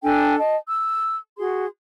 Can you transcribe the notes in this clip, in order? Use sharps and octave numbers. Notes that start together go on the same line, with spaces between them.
D4 A4 G5 G#5
D#5 A5
E6
F#4 G#4 C6